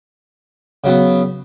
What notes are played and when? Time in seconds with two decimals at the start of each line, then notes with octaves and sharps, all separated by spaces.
0.84 C#3 F#3 B3